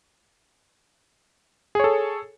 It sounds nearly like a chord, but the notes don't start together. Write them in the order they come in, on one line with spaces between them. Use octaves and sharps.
G#4 C#5 A4